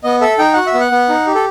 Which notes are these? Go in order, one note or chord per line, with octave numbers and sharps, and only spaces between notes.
B3 D#5
A4 E5
D#4 G5
F#4 F#5
E5
B3
F#5
B3
D#4
G4
A4